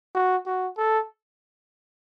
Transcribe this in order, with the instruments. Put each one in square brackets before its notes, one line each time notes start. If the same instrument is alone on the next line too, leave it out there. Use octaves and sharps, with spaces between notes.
[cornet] F#4
F#4
A4